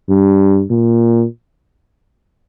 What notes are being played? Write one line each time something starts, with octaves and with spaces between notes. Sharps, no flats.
G2
A#2